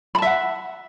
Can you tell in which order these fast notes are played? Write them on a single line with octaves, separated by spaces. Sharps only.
B5 A5 E5 F#5